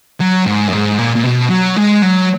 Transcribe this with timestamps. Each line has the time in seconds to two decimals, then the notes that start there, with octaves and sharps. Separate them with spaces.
0.21 F#3
0.46 G#2
0.68 F#2
0.73 G#2
0.99 A#2
1.16 A#2
1.24 B2
1.50 F#3
1.76 G#3
2.02 F#3